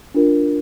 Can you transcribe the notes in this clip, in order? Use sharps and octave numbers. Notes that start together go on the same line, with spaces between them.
D4 F4 A#4